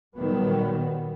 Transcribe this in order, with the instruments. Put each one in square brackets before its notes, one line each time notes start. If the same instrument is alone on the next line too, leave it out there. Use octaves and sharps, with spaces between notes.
[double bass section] A#2 D#3 F#3 G3 B3